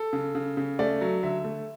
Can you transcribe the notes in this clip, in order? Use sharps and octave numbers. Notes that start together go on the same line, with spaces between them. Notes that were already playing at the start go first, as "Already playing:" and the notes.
Already playing: A4
C#3
C#3
C#3
A3 D5
F#3
D3 E5
A3